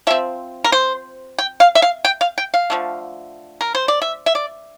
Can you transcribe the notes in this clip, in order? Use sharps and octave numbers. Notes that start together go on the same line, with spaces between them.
F3 C4 E5
A#4
C5
G5
F5
E5
F5
G5
F5
G5
F5
D3 F3 A3
A#4
C5
D5
E5
E5
D5